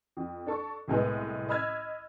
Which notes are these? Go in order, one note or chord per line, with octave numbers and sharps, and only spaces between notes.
F2
D4 A4 C#6
C2 A2 G#3 B3
D#5 B5 E6 F6 G#6